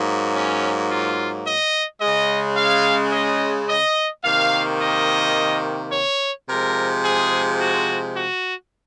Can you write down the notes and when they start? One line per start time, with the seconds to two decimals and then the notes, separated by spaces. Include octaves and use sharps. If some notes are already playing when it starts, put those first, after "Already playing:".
Already playing: G#2 F#3 A#3
0.34 C#4
0.90 F4
1.45 D#5
2.01 C#3 G#3 D#5
2.57 F5
3.12 D#5
3.69 D#5
4.24 C3 D#3 A#3 F5
4.80 D#5
5.92 C#5
6.48 C3 F3 G#3 A#4
7.05 G#4
7.60 F#4
8.15 F#4